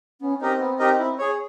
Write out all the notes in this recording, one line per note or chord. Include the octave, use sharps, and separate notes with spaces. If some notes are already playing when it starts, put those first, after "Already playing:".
B3 C#4
C4 D#4 G4 A#4 D#5
B3
D#4 G4 A#4 D#5
E4
G#4 C#5